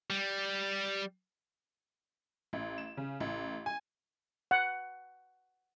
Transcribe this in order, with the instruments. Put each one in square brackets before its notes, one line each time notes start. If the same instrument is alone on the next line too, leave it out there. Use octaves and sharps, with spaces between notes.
[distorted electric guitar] G3
[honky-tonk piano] A1
E7
C#3
A1
G#5
[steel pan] F#5